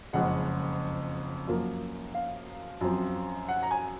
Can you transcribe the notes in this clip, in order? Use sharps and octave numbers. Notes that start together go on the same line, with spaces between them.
F#1 F2 C#3 G#3 F#5
F#2 F3 A#3
F5
F#2 F3 C4
F#5
A#5
G#5